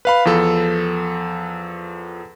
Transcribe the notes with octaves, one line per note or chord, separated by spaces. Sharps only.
B4 F5 B5
E2 F3 A4